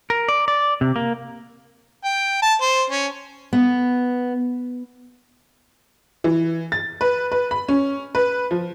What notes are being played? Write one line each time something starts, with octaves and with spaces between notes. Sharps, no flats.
A#4
D5
D5
C3
A#3
G5
A5
C5
C#4
B3
E3
A6
B4
B4
B5
C#4
B4
F3